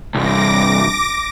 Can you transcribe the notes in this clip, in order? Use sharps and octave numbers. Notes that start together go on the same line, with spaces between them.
C2 G2 D6 A#6